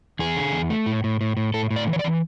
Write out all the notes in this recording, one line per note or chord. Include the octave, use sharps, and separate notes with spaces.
E2 G#4
D3
E2
A3
A2
A2
A2
A2
A2 A4
A2
D5
E3
C#5
D5
E3